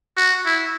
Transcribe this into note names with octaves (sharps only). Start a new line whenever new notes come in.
F#4
E4